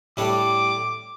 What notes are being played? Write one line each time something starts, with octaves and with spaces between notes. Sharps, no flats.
A2 G3 D4 A4 C#5 D6